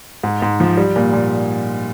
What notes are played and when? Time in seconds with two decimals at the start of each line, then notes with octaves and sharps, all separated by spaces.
0.24 G#2
0.42 G#2
0.60 F3
0.77 G3
0.96 A#2
1.13 A#2